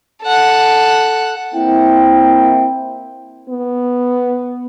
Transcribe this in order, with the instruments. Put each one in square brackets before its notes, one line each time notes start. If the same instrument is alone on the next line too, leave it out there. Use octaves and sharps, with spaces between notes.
[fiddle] A4 F#5
[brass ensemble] A#3 C4 E4 G5
[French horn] B3